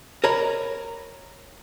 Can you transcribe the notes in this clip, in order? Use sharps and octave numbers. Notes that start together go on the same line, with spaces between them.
A#4 C#5 D#5 A#5 B5